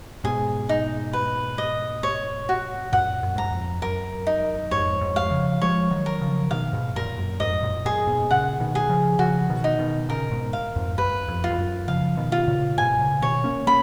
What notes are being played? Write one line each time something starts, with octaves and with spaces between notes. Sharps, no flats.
G#2 B2 G#4
D#4
B4
D#5
C#5
F#4
F#2 A#2 F#5
F#2
G#2 A#5
F#2
F2
F#2 A#4
D#4
F2 G#2 C#5
F2 G#2
F5
C#3 F3
F3 G#3 C#5
D#3 F#3
A#4
C#3 F3
B2 D#3 F5
G#2 B2
F#2 A#2 A#4
F#2
F2 G#2 D#5
F#2 A#2
F#2 A#2 G#4
G#2 B2
A#2 C#3 F#5
B2 D#3
G#4
C#3 F3
C#3 F3 F#4
B2 D#3
D#4
B2 D#3
A#2 C#3 A#4
G#2 B2
F5
F2 G#2
F#2 B4
F2
F4
F2
F#2
C#3 F3 F5
B2 D#3
F4
A#2 C#3
G#2 B2 G#5
A#2 C#3
B2 D#3 C#5
A#3 C#4
A#3 C#4 B5